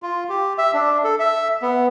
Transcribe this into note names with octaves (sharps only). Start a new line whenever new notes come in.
F4
G4
E5
D4
A4
E5
B3